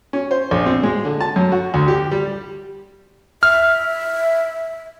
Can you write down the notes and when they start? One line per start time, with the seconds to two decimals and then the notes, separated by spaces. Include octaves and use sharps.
0.13 C#4
0.31 C5
0.51 A#1
0.66 C4
0.83 G#3
1.05 D3
1.21 A5
1.36 F#2
1.52 F#4
1.74 D2
1.88 G4
2.11 G3
3.43 E5 F6